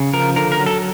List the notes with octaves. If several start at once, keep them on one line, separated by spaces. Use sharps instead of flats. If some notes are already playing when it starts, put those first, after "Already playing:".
Already playing: C#3
F3 A#4
D3 A#4
A#4
F#3
A4